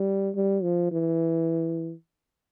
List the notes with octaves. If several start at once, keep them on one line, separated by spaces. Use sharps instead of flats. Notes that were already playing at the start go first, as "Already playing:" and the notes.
Already playing: G3
G3
F3
E3